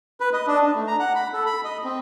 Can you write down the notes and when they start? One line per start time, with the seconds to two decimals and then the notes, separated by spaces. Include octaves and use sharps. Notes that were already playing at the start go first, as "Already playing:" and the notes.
0.20 B4
0.33 D#5
0.47 D4
0.62 D4
0.75 A3
0.87 A#5
0.99 F#5
1.15 B5
1.33 A4
1.46 B5
1.64 D#5
1.84 C4